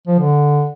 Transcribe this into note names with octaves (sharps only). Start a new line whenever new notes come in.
F3
D3